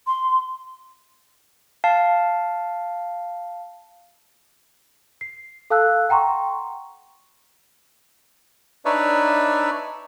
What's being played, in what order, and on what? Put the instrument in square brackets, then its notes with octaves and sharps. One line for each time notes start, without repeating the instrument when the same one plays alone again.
[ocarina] C6
[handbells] F5 A5
[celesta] C7
A4 F5 A5 E6 F#6
F#5 G5 A#5 C6 C#6
[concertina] D4 D#4 B4 C#5 D5 E5